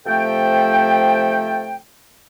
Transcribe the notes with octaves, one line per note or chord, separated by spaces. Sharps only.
C3 F3 A3 A4 G5